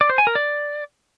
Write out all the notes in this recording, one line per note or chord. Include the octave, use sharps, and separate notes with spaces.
D5
C5
G#5
A#4
D5